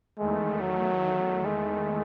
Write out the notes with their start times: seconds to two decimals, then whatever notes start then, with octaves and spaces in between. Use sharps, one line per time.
0.18 E2 D#3 G#3 A3
0.61 F#3
1.45 G#3